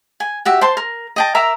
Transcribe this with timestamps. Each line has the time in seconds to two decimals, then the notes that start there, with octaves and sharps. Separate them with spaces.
0.20 G#5
0.45 F#4 G4 E5
0.61 C5 A5 C6
0.77 A#4
1.16 D#5 G5 A5
1.35 A#4 E5 A#5 D6